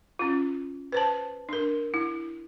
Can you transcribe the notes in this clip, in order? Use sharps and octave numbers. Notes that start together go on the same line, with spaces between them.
C#4 F4
B4 C5 A5
D4 A#4
E4